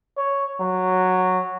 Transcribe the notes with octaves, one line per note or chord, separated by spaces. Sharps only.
C#5
F#3